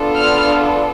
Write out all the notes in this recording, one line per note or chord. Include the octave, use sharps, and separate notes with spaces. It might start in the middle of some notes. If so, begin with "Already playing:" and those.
Already playing: B3 D4 F4 A4
F6